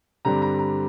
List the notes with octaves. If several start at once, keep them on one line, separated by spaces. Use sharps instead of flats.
G2 D3 G3 C4 A#5
A#5
A#5